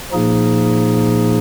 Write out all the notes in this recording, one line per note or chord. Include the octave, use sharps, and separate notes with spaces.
A#2 F3 A#3 D#4 G#4